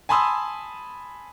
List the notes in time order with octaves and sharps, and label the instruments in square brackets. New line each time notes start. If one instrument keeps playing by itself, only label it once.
[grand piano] G#5 A5 B5 C6 D#6 E6